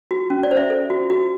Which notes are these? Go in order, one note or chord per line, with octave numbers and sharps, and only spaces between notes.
F#4
C#4
D5
C5
E5
A4
F#4
F#4